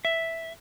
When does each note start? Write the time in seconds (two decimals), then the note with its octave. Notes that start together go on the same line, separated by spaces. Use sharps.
0.05 E5